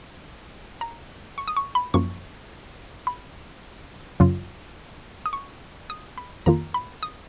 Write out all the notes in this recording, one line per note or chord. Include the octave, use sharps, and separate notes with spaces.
A#5
C#6
D#6
C#6
B5
F#2 F3 A#3 F4 C#6
B5
F#2 C#3 F#3 C#4 F4
D#6
C#6
D#6
B5
F2 D#3 A#3 F4 A#5
B5
D#6